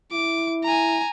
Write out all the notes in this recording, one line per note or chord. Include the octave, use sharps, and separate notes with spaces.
E4 D6
G#5 A#5